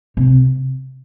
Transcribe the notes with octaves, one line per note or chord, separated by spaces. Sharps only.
C3